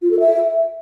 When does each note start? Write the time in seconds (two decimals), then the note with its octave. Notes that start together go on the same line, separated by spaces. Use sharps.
0.02 F4
0.11 A4
0.20 E5